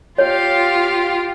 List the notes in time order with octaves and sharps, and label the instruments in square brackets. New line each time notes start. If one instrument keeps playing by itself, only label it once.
[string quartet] F4 G4 F5 [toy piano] C#5